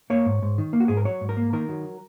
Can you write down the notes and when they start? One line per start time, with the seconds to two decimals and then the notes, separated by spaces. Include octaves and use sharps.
0.10 A#3 C#5
0.26 G#2
0.42 G#2
0.58 D#3
0.73 A#3
0.80 F#4
0.88 G#2 G#4
0.97 A#4
1.05 F#3 C#5
1.21 G#2
1.29 A#4
1.37 A#3
1.53 D#3 A#4
1.69 F#3